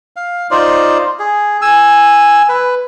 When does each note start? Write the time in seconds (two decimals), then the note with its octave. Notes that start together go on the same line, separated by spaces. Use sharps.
0.16 F5
0.51 D#4 F4 C5 D5
1.19 G#4
1.62 G#5 E6
2.49 B4